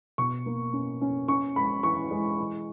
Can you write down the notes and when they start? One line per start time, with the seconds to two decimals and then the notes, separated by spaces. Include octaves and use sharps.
0.18 B2 C#6
0.46 A#3
0.73 C#4
1.01 C#4
1.28 C#4 C#6
1.56 G#3 B5
1.83 E3 C#6
2.11 G#3
2.39 E3